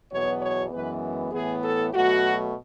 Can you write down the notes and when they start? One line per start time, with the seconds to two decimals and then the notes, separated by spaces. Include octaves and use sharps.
0.10 E2 B2 F#3 B3 C#5
0.40 C#5
0.71 F#2 E3 G#3 B3 B4
1.32 A2 E3 B3 G#4
1.62 A4
1.92 B2 F#3 A3 F#4